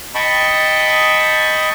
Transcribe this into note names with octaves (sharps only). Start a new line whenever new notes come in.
D#5 G5 A5 B5 C#6 D#6